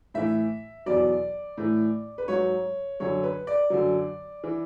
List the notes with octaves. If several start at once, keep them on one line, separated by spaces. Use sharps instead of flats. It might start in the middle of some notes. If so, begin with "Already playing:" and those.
A2 E3 E5
E2 B2 F#3 D5
A2 E3
B4
G#2 F#3 C#5
F#2 D3 F#3 C#5
B4
D5
F#2 D3 F#3
E3